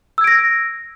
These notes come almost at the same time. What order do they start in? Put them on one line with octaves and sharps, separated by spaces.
E6 G#6 D7 A#6